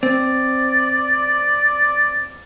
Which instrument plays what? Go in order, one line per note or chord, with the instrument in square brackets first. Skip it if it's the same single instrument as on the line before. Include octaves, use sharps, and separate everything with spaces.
[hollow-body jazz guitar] C4 [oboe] D5